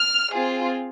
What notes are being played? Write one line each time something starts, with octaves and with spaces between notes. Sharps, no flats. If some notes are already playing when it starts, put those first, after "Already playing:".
Already playing: F6
C4 F4 G#4